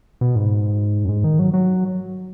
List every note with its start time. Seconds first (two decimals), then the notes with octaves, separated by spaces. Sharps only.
0.21 B2
0.36 G#2
1.05 F#2
1.09 G#2
1.24 D#3
1.39 F#3
1.53 F#3